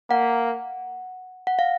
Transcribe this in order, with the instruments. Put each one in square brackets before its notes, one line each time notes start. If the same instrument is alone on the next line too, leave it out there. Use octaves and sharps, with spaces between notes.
[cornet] A#3 [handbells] F#5
[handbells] F#5
F5